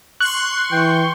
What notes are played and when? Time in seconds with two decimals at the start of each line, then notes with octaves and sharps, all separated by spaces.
0.21 C6 C#6 F#6
0.72 E3 G5